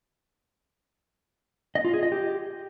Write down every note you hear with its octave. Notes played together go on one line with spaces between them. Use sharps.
D#5
F4
G#4
D#5
G4